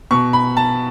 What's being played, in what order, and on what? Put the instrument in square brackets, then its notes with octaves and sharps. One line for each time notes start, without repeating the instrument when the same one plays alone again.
[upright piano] B2 C#6
B5
A5